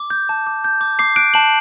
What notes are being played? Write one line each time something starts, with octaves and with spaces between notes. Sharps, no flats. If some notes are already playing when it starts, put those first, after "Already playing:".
Already playing: D6
G6
A5
D6
G6
D6
D6 C7
F#6 D7
A5 F#7